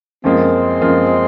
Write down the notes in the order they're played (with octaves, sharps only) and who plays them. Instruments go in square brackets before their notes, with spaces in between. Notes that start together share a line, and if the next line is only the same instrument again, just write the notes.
[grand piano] F#2 F3 A#3 F4 [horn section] G#3 C4
[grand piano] F#2 F3 A#3 F4